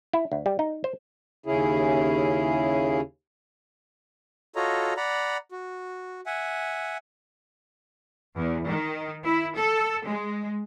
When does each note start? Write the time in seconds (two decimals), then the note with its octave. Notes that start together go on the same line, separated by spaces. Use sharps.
0.13 E4
0.32 D2
0.46 G3
0.59 D#4
0.84 C5
1.46 D#2 C#3 C#4 E4 G#4
4.56 F4 F#4 A4 C#5 D#5 A#5
4.97 D5 F#5 A#5 B5
5.52 F#4
6.26 E5 F#5 G#5
8.36 E2
8.68 D#3
9.24 E4
9.56 A4
10.06 G#3